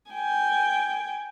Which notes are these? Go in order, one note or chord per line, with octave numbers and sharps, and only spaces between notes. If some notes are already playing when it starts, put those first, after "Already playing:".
G5 G#5